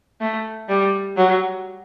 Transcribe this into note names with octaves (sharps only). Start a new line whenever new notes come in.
A3
G3
F#3